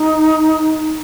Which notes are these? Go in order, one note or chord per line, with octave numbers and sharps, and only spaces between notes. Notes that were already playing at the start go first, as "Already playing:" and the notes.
Already playing: D#4